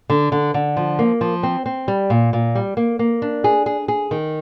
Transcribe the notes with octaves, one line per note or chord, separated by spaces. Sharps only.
D3
D3
D3
F3
A#3
F3
C4
C4
G3
A#2
A#2
G3
A#3
A#3
D4
G#4
G#4
G#4
D#3